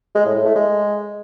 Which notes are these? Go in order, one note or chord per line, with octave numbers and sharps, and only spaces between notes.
G#3
A2
A2
A3
G#3